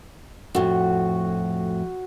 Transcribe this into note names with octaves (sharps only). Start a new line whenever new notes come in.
F2 A2 F#4